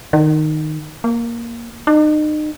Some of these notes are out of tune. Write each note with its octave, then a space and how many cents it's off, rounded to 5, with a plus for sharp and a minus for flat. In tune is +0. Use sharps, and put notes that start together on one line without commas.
D#3 -10
A#3 +5
D#4 -35